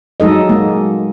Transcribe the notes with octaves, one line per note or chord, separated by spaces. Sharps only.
F#3 G#3 D#4 A4 D#5
G#3 A#3